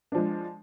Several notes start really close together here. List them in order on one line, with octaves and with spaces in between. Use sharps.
D4 F3 G#3